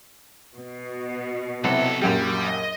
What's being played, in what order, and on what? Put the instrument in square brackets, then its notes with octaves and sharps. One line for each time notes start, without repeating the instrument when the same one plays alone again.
[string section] B2
[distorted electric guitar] B1 A4 [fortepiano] C3 F#3 E4
[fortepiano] A#1 F#2 G4 [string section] F#3 [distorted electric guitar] G3
[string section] D#5